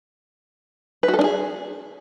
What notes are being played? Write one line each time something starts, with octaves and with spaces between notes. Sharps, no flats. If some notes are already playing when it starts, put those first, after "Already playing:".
B4
F#4
A4
D4
G#4